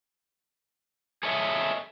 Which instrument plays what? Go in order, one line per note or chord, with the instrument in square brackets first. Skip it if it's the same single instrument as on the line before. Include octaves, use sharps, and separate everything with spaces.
[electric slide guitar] G#4 A4 C#5 D#5 E5